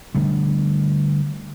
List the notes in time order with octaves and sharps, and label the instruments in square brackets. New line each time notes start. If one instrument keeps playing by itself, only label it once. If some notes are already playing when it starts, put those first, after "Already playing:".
[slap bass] D3 G3 A3